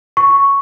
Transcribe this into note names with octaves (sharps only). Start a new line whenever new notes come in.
C#6